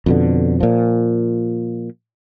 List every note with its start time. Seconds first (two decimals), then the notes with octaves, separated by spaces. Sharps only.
0.06 F2 B2 D3
0.60 A#2 F3